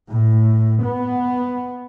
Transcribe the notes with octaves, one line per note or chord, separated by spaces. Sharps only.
A2
B3